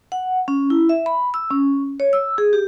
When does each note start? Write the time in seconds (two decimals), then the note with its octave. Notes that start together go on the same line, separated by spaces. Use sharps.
0.12 F#5
0.48 C#4
0.70 E4
0.89 E5
1.06 B5
1.34 E6
1.51 C#4
2.00 C#5
2.13 E6
2.38 G#4
2.53 G4